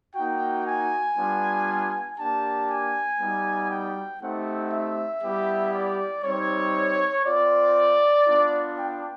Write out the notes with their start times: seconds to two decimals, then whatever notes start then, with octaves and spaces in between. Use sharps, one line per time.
0.15 A#3 D#4 F#4 G5
0.66 G#5
1.16 G3 B3 D4 F4
2.18 A#3 D4 G4 A5
2.68 G#5
3.19 G3 B3 D#4 F#4
3.71 G5
4.20 A3 C4 D#4 G4 F#5
4.72 E5
5.23 G3 B3 E4 G4
5.73 D5
6.23 G3 C4 D#4 C#5
7.25 C4 F4 D5
8.26 B3 D4 F4
8.78 G5